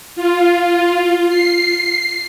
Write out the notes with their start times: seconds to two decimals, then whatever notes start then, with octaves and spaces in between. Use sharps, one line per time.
0.16 F4
1.29 C7